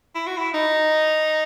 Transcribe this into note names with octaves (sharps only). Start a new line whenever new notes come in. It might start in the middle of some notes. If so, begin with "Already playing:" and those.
E4
F#4
E4
D#4